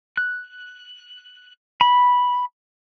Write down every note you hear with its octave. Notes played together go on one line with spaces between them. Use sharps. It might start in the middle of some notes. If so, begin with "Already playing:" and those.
F#6
B5